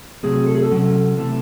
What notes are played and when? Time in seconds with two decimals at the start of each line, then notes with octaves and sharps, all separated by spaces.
0.23 C3 F#3 A3 C4 G#4
0.46 A4
0.55 G#4
0.63 A4
0.71 C3 F#3 C#4
1.17 C3 E3 A3